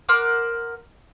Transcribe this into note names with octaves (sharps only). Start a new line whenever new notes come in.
A#4 C5 F#5 D6